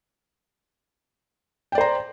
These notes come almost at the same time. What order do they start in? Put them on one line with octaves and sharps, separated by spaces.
G5 D5 C5 A#5